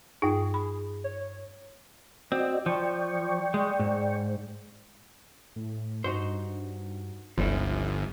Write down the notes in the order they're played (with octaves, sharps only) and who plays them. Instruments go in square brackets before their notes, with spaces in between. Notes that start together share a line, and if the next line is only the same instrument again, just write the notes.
[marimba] G2 D#4 [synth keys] G#4
[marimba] B5
[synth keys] C#5
[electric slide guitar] C4 [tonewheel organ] F#4 D5 D#5
[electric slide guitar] F3 [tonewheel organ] D5 G5 C#6
[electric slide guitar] G#3
G#2
[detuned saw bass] A2
[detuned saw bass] G2 [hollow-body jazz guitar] D#4 F#4 C5
[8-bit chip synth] G1 [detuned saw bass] C#2 [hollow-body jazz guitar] F3 G3 E4